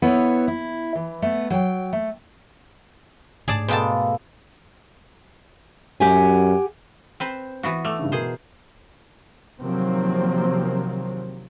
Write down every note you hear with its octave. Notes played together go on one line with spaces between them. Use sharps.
B3 E4 A4 B4 C#5
E4
E3
A3 B3
F#3 G5
A3
G#2 A3 G#4 D5 A5
B2 G#3 A#3 A4 G5 A5
F#2 G4 F#5 G#5
C4 B4 C5
E3 B3 F#4
A3 D6 E6 F7
G2 C#3
B2 G#4 A#4 C5
C3 D#3 F3 F#3 A#3 C4